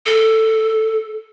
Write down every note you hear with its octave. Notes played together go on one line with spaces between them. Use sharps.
A4